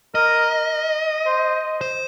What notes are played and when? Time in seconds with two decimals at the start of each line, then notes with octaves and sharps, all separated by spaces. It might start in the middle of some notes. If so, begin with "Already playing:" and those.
0.15 A#4 D#5
1.26 C5
1.81 C5